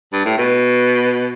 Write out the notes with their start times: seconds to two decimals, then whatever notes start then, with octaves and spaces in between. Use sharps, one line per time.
0.13 G2
0.25 A2
0.38 B2